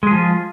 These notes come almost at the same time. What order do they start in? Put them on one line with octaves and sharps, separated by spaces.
G#3 G#4 F3 F4